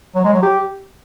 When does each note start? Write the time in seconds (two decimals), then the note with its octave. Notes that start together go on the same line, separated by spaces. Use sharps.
0.15 F#3
0.24 G#3
0.33 F#3
0.42 G4